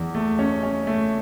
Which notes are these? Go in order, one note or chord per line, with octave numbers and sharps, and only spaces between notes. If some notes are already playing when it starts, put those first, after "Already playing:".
Already playing: E2
A3
C#4
C#4
A3